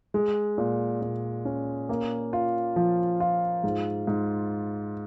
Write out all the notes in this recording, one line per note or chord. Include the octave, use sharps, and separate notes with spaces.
G#3
A#2
A#2
C#4
A#3
F4
F3
F4
G#2
G#2